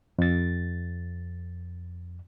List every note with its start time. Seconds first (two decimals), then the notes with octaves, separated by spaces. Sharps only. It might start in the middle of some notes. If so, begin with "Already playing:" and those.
0.18 F2 A6